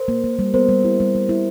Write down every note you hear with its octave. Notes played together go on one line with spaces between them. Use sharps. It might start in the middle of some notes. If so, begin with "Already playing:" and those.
Already playing: A#4 C5
A#3
A#3
G3
B3 A#4 C5
G3
E4
G3
G3
E4